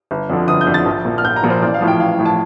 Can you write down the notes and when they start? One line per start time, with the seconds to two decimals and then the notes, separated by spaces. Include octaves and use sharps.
0.11 G1
0.30 F2 D3 F3
0.48 G1 D#6
0.61 G6
0.67 F2 D3 F3
0.74 A6
0.86 A#1
1.05 A#2 F3
1.18 F6
1.24 A#1 G6
1.36 A#5
1.43 A#2 F3
1.50 C5
1.62 A1 D5
1.74 F5
1.81 A2 F3
1.88 G5
2.00 A1 F5
2.19 A2 F3
2.25 A5